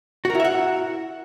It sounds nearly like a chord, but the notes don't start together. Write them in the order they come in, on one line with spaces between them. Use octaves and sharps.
F#4 A#4 E4 E5 F#5